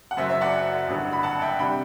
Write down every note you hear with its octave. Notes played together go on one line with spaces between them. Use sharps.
F#5
F#1 F#2 F#3 C5 E5
C5 E5
D5 F#5
A1 G2 D3
B5
F#5 A5
E5 G5
C3 G3 D4 G5 B5